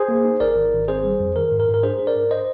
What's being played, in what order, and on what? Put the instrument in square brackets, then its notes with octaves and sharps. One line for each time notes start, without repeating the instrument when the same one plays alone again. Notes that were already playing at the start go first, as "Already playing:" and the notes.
Already playing: [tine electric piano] G#4 C5
A#3
D#4
G#1 A#4 D5
G#1
G#1
C4 G#4 C5
G3
F2
D#3 A#4
G#2
A#4
G#2
A#4
D4 G#4 C5
D4
A#4 D5
G#2
C5 D#5